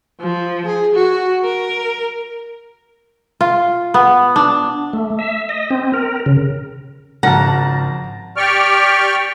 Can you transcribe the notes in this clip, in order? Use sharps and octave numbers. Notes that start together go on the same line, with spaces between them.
F3
G#4
F#4
A#4
F4
B3
D4
A3
E5
D#5
C4
A#4
C#3
G#1 C#3 F3 F#5 A5 A#5 F6
G4 D5 G5 C#6 F6